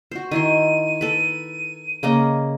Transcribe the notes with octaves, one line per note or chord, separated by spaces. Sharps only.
F#4 C5
D#3 E4 C6 D#7
A4 B4
C#3 A#3 D#5